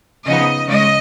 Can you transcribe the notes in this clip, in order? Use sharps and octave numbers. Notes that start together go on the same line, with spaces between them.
C#3 F3 B3 D#4 D#5
C#3 G#3 D#5